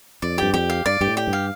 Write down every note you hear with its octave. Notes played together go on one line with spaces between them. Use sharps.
F2 D5
G2 G4
F2 G4
F5
G2 D5
G2 G4
A2
G4
G2
F5